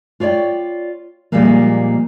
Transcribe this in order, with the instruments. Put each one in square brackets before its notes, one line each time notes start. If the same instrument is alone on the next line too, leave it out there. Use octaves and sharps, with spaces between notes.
[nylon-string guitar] F4 C#5 D5 E5 G5
A#2 F3 G3 G#3 A#3